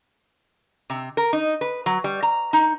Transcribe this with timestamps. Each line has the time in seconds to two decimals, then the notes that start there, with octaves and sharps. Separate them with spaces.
0.90 C3
1.17 A#4
1.33 D#4
1.61 B4
1.86 F#3
2.04 G3
2.22 A#5
2.53 D#4